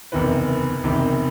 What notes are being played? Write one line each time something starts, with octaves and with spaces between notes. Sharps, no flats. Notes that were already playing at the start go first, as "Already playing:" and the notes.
F#1 E2 C3 D#3 B4
F#1 E2 C3 D#3